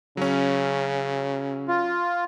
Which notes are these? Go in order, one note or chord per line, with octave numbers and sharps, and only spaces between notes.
C#3 F#3 C#4
F4